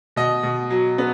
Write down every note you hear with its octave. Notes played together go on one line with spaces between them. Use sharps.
B2 D#5
B2
F#3
B3